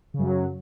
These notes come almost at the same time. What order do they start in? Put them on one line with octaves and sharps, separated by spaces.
C#3 F#2 F#3